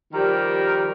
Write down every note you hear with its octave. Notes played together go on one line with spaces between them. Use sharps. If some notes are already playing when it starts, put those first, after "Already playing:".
D#3 F3 G3 G4 A#4